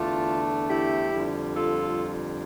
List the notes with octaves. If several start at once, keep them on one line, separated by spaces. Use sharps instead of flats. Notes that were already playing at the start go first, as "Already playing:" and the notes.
Already playing: E2 D3 A3 D4 F4
E4 G4
F2 D3 G3
F4 A4